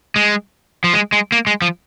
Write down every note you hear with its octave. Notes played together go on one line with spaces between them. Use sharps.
G#3
F3
G#3
G#3
A#3
G#3
F3